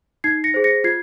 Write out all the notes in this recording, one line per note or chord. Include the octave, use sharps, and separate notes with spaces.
D#4 G#6 C7
A#6 C#7
G#4 C5
A#6 C#7
F4 G#6 C7